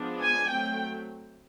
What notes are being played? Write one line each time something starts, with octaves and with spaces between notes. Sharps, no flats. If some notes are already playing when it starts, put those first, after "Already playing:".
Already playing: F3 G#3 B3 D4
G#5
F#3 A3 C4 G5